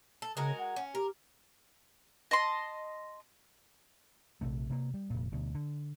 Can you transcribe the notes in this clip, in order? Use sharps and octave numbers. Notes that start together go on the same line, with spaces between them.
A4
C#3 G#3 F#4 A#4
F#5
C#4
G4 A#4
D#5 A5 C6
A#1 C3 A3
C3 A#3
G3
F1 A#2
D2 B2
D3